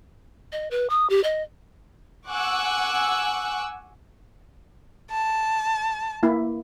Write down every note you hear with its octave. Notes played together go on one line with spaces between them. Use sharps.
D#5
B4
D#6
G4
D#5
F#5 G#5 C#6 D6 E6 F#6
A5
A#3 E4